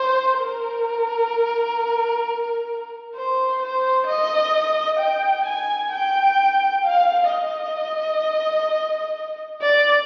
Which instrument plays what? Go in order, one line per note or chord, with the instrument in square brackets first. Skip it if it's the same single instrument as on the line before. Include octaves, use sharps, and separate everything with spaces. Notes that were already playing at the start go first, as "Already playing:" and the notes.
Already playing: [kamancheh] C5
A#4
C5
C5
D#5
G5
G#5
G5
F5
D#5
D5